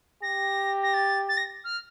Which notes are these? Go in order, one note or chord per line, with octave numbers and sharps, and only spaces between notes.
G4 A#6
A#6
A6
A6
A#6
F6